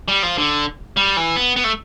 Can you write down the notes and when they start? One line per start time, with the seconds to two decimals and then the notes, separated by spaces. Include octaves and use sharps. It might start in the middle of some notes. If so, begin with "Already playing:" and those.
0.08 G3
0.23 F3
0.38 D3
0.97 G3
1.17 E3
1.36 B3
1.56 B3
1.64 A3